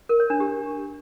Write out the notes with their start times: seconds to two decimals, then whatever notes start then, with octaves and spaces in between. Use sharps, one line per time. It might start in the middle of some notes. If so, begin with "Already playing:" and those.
0.09 A#4
0.20 C#5
0.30 D4
0.40 G4